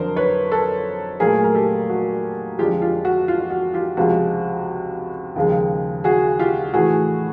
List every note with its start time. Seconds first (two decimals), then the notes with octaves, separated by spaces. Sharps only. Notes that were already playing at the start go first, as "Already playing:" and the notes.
Already playing: F2 D3 F#3 A#4 C5
0.16 B4 C#5
0.51 A4 B4
1.20 A#2 F#3 A3 G#4 A#4
1.44 A#4
1.55 G4 A4
1.90 F#4
2.58 F2 D3 F3 G#3 F4 G4
2.82 F4 G4
3.05 F#4
3.28 F4
3.50 F#4
3.74 F4 G4
3.97 C#2 C3 F3 G#3 F#4
5.36 D#2 C#3 F3 G#3
6.04 F#4 G#4
6.39 F4 G4
6.73 A2 E3 A3 F#4 G#4